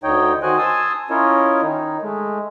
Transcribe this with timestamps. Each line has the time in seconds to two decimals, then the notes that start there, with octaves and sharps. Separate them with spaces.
0.04 D2 D3 D#4 C#5 D#5 G5
0.43 D#3 F#4 C5 D#5 G#5 F#6
0.58 G#5 A5 C6 D#6 E6
1.10 C#4 E4 F4 A#4 C#5 D#5
1.62 D#3 D#4
2.02 G#3 A3